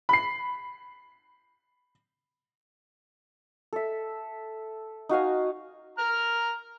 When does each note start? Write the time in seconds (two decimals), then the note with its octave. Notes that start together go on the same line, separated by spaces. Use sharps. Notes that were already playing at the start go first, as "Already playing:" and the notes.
0.09 B5 C7
3.73 A4 E5
5.09 D#4 F#4 F5 G#5
5.98 A#5 F6